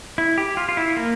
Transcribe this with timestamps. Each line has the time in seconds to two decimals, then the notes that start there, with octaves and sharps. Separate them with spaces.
0.18 E4
0.38 G4
0.57 F4
0.69 F4
0.77 E4
0.97 A#3